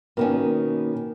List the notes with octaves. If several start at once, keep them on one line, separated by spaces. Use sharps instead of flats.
B2 D#3 A#3 C#4